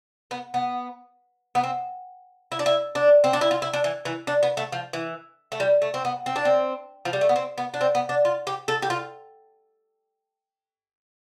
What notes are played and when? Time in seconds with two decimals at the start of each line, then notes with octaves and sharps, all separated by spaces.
0.31 B3
0.54 B3
1.55 B3
1.63 C4
2.52 E4
2.59 D4
2.66 E4
2.95 D4
3.24 C4
3.33 D4
3.41 E4
3.51 F4
3.62 E4
3.73 D4
3.84 E3
4.05 E3
4.27 D4
4.43 B3
4.57 A3
4.72 F3
4.93 E3
5.52 A3
5.60 G3
5.82 A3
5.94 C4
6.05 B3
6.26 C4
6.36 D4
6.45 C4
7.05 F3
7.13 G3
7.21 A3
7.29 B3
7.36 C4
7.58 B3
7.74 D4
7.81 C4
7.95 B3
8.09 D4
8.25 F4
8.47 G4
8.68 A4
8.82 G4
8.90 F4